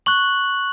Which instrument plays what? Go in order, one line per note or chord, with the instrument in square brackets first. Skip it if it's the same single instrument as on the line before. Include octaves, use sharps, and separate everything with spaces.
[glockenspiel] C#6 F#6 F#7